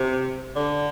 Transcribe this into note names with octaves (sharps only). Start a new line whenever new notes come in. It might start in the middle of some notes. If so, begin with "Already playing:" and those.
Already playing: C3
D3